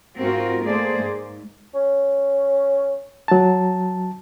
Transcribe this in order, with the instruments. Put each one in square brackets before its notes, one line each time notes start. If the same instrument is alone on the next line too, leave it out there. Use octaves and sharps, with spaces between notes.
[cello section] G#2 C4 F4 F#4 A#4
A3 A#3 G#4 C5 D5
G#2
[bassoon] C#4
[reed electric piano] F#3 A5